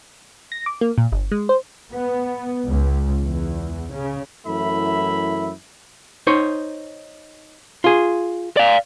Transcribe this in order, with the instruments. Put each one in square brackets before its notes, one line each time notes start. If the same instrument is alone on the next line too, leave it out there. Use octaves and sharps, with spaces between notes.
[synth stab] A#6
D6
A#3
A#2
G1
G#3
C5
[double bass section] B3
C#2
E2
C#3
[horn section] F#2 E3 A3 E4 E5 B5
[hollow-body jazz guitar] D#4 C5 C#5
F4 G#4
[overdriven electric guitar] D5 F5